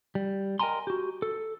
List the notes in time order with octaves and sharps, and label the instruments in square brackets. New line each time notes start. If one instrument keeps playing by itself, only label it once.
[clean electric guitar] G3
A#4 D#5 G5 G#5 A#5 C6
F#4 G4
A4